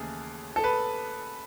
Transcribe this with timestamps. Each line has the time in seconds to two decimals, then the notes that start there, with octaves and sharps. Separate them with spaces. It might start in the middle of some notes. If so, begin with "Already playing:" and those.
Already playing: D#2 C#3 E3 A3 G#4
0.56 A4
0.64 B4